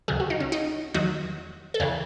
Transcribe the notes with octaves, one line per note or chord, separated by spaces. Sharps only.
C#2 C#3 F#3 G#4
F#4
D#4
C#4
D#4
E2 D#3 F#3 F#4
A4
E2 C#3 E3 G#4